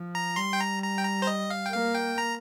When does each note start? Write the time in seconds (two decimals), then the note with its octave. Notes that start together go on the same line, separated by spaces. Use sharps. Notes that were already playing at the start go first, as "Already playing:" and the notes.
Already playing: F3
0.15 A#5
0.36 G3 C6
0.53 G5
0.60 A#5
0.83 A#5
0.98 G5
1.05 A#5
1.22 C5
1.27 D#5
1.50 F5
1.66 G5
1.72 A#3 F5
1.95 G5
2.18 A#5